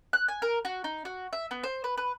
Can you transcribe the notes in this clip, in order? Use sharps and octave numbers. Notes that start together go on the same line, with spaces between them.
F#6
G#5
A#4
F#4
D#4
F#4
E5
B3
C5
B4
B4